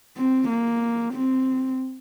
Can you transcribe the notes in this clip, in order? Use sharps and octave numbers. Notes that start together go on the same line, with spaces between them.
C4
A#3
C4